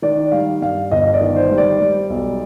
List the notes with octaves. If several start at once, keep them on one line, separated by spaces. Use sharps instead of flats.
D#3 D5
G3 F5
G2 F5
G1 D#5
D5
D#3
C5
G3
D5
G3
B1